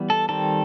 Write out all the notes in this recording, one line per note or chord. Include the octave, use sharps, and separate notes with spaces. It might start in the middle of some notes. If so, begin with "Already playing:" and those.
Already playing: E3 G3 B3
A4
D#3 G3 C4 A4